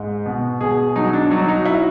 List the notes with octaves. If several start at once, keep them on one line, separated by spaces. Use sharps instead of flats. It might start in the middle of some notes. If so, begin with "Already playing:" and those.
Already playing: G#2
B2
B2 G#4
F#3 D#4
D4
F#3 D#4
D#4
E4